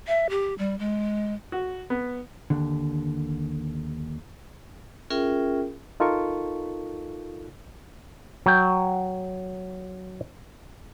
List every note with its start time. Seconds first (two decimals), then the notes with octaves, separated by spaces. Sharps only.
0.07 E5
0.30 G4
0.58 G3
0.79 G#3
1.52 F#4
1.90 B3
2.50 D#2 D3
5.10 C#4 F4 G#4 A#4 E5 G5
6.00 D#4 F4 A4 A#4 C#6
8.46 F#3 G5